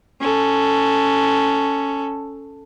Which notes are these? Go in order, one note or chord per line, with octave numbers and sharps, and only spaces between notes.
C#4 A4